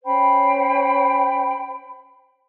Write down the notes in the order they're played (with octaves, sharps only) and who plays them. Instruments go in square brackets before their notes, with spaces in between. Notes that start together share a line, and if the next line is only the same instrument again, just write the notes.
[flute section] C#4 C5 G5 B5